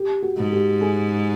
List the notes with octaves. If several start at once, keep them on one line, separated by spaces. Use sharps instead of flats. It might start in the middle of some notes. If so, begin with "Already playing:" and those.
Already playing: G4
F#4
G#2
G4
G#4